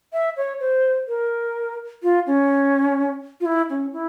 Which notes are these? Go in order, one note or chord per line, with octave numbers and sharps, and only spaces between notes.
E5
C#5
C5
A#4
F4
C#4
F4
E4
C#4
E4